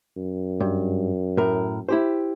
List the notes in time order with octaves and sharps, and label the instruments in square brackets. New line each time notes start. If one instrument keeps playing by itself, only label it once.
[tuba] F#2
[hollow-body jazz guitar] G2
A2 A#4
E4 G4 C5